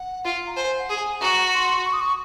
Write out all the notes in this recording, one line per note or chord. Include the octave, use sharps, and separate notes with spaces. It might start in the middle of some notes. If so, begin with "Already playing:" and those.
Already playing: F#5
F4
A#5
C5 G#5
F#5
G#4
G#5
F#4 A#5
C6
C#6
D#6
C#6